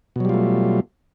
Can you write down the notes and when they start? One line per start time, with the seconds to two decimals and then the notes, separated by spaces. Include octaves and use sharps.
0.16 B2
0.20 F#3
0.25 G3
0.29 F4
0.34 A3